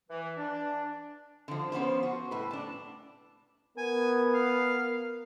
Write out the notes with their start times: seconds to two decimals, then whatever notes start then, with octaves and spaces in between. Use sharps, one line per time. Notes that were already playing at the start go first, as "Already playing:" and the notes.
0.09 E3
0.37 D4
1.48 D3 F3
1.72 F3 B3 C#4 C5
2.03 F#4
2.31 A2 B4
2.51 D4 A5
3.78 B3 A#4 G#5
4.34 F5